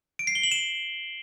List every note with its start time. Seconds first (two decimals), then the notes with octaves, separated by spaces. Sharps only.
0.19 D7
0.27 C7
0.35 G7
0.43 F#7
0.52 E7